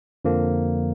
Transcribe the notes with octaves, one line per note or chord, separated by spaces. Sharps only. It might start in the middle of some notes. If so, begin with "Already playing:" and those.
F2 D3 F3 A#3